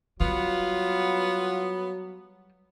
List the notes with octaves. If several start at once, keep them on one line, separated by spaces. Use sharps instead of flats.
F#3 G3 B3 F4